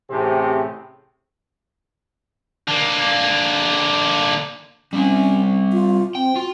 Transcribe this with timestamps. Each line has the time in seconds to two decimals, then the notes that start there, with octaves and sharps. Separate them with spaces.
0.10 A1 A2 C3 C4 G4 G#4
2.68 D3 A#3
4.93 G3 C4 C#4
5.73 F4
6.15 C4 G5
6.36 F4 F#4